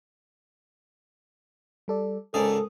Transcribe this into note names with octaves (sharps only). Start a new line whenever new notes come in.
G3 A4 D5
C#2 G#2 A4 A#4 D5 D#6